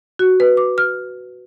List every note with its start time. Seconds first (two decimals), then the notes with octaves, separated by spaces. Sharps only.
0.19 F#4
0.40 B4
0.57 D6
0.78 F6